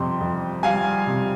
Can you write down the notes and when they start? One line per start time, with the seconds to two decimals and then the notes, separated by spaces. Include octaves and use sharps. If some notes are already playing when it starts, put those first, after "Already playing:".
Already playing: F2 C3 G3 C6
0.21 F2
0.63 G3 F5 G#5
1.07 C3